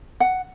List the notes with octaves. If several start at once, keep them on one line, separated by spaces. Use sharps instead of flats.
F#5